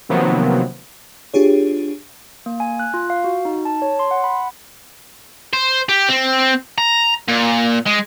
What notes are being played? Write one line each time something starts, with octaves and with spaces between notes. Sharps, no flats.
C3 D#3 F3 F#3 A#3 B3
D4 F4 G4 G#4 C#5
A#3
G#5
F#6
F4
F5
F#4
D#4
A5
C#5
C6
F#5
B5
C5
G4
C4
A#5
A#2
G#3